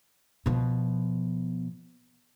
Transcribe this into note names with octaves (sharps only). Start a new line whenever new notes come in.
B2 F3